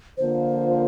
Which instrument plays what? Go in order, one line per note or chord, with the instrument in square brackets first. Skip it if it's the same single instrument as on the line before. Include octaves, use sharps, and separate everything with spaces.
[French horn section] D3 F3 A#3 F4 [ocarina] C5